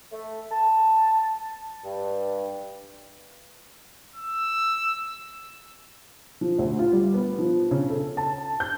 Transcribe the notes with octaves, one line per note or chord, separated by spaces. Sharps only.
A3
A5
G2
E6
F3
D2
F4
G3
B3
F3
C#3
A4
A5
G6